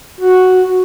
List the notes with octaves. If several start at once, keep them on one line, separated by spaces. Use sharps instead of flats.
F#4